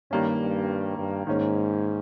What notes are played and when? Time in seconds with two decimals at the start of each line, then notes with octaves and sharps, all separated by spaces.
0.11 G2 D#3 G3 A#3 C#4
0.40 G2
0.98 G2
1.27 G#2 D#3 A#3 C#4